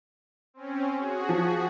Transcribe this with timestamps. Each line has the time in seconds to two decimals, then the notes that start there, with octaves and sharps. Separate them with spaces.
0.54 C4 C#4
0.95 F#4 G#4
1.29 F3